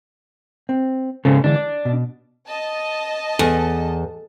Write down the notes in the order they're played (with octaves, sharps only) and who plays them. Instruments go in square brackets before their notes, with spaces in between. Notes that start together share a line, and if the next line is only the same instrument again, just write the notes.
[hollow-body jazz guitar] C4
[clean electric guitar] G#2 C#3 [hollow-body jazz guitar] A4 C5
[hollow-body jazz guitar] D3 E3 G#3 [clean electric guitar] D4
[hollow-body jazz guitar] D5
B2
[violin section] D#5 A5
[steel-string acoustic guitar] E2 [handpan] A4